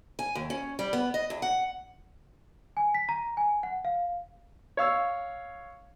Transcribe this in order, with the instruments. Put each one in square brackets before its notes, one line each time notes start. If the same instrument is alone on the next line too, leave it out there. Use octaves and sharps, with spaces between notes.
[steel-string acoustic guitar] G#5
D#2
C#4
G3
B3
D#5
E2
F#5
[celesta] G#5
B6
A#5
G#5
F#5
F5
[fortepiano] C#5 F5 E6